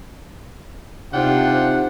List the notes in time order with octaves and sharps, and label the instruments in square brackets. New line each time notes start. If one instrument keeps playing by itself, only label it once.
[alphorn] C3 [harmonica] D4 F4 G5 [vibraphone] D#4 [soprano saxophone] F#5